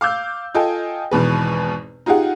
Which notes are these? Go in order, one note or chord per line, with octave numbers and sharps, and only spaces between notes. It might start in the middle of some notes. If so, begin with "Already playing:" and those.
F5 D6 E6 G6
F4 A4 D#5 G5 G#5
G#1 E2 B2 B4
D#4 F4 G4 G#4 F#5